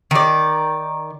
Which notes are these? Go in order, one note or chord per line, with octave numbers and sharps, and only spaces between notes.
D#3 D5